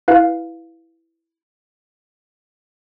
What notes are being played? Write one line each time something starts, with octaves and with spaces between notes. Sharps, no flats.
E4 B4 F5